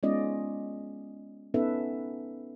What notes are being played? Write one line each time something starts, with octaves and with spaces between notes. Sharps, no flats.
G#3 B3 C#4 F4 D5 D#5
B3 C#4 D#4 A4 B4 E5